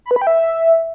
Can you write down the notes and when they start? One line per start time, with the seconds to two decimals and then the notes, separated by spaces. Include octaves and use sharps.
0.06 B5
0.11 B4
0.16 B5
0.22 G5
0.27 E5